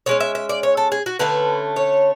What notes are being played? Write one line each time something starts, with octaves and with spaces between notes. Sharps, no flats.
D3 G#3 C#4 C#5
E5
E5
D5
C#5
A4
G#4
F#4
D3 A3 C#4 B4
C#5